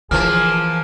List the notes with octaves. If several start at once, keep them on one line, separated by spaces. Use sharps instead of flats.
E3 F3 A#3 G#4 F6